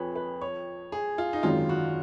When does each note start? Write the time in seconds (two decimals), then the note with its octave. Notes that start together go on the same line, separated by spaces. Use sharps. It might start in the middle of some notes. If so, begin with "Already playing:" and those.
Already playing: F2 F3 G#4 B4 C#5
0.15 B4
0.41 C#5
0.92 G#4
1.18 F4
1.33 D#4
1.43 G#1 F#2 D#3 G#3 F4
1.69 F#4